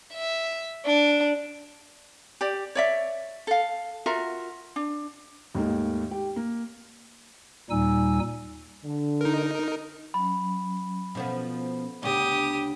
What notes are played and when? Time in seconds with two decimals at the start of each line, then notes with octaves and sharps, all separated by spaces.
0.14 E5
0.86 D4
2.41 G4 D5
2.75 C#5 D5 E5
3.47 A4 F5
4.06 F4 F#4 A#4 E5
4.76 D4
5.55 D#2 G#2 D#3 A3 A#3
6.11 G4
6.36 A#3
7.70 D#2 A#2 G3 D#4 G#5 E6
8.84 D3
9.21 D#4 A#4
10.14 F#3 C#4 B5
11.15 B2 F3 B3 C#4 A4
12.03 D2 C#3 B3 G4 D#6